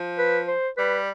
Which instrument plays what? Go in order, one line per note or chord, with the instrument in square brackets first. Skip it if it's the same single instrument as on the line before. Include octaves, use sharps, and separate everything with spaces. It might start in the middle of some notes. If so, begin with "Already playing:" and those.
Already playing: [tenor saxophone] F3
[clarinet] B4
C5
[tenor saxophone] G3 [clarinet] B4